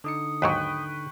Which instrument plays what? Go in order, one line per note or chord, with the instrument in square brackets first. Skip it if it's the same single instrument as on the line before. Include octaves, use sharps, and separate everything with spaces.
[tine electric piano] D3 D#4 C#7 [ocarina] D#6
[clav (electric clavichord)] D#2 G#2 F#3 [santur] B4 G5 C#6